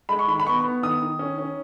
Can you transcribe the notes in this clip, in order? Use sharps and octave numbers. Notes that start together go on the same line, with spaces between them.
G#3 B5
C#6
D#3 B5
B5
B3 C#6
B3
D#3 D#6
D#3
C#4
C#4